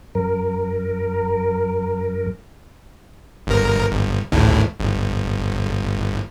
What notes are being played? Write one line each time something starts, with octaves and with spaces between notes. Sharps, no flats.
F#2 A#4
G1 A#4
G1
G#1 D2 A2
G1